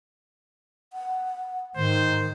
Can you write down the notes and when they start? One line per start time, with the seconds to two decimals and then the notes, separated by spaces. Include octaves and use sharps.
0.93 F#5
1.76 G#2 D#3 C5